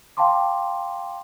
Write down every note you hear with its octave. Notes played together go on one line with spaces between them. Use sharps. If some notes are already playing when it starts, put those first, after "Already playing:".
F5 G5 A5 C6 D6